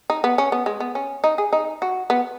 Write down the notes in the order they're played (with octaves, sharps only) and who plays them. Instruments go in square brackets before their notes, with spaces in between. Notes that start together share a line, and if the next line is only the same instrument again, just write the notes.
[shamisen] D#4
B3
C#4
B3
G#3
B3
C#4
D#4
G#4
D#4
F#4
B3